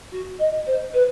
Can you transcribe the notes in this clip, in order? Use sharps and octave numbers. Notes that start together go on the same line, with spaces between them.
F#4
D#5
C5
B4